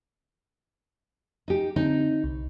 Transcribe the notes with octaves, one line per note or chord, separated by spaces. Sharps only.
D#4 G4
D3 C4 D#4
C2